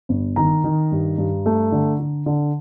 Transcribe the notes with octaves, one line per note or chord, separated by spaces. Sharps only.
G1
D#3 A#5
D#3
G2
G2
A3
D3
D3
D3